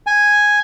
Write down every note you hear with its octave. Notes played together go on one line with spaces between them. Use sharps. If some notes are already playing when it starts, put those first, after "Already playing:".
G#5